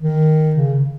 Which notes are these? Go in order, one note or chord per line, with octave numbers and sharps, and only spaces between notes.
D#3
C#3